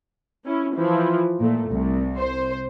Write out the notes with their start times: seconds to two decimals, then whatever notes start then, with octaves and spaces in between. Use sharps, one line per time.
0.45 C#4 E4
0.75 E3 F3
1.40 A#2 A3
1.70 C2
2.18 C5